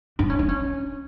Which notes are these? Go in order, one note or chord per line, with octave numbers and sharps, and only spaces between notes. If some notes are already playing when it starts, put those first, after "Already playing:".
D4
C#4
D4
C#4